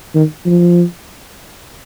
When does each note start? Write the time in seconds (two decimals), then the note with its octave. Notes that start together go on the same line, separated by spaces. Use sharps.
0.15 D#3
0.46 F3